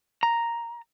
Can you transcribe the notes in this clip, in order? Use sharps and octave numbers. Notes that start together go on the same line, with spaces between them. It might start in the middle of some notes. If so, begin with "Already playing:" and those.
A#5